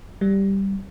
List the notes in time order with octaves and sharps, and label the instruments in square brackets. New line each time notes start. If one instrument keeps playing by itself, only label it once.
[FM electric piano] G3